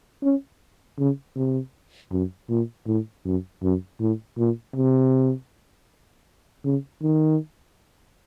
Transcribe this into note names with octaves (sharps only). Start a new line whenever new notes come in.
C#4
C#3
C3
F#2
A#2
A2
F#2
F#2
A2
A#2
C3
C#3
D#3